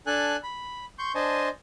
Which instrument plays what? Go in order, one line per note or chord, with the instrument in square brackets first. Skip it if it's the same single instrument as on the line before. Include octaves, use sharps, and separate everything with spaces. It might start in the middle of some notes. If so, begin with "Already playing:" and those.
[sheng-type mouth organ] D4 A4 G#5 F#6
B5
C6 C#6 G6
D4 C5 D#5 G#5 A5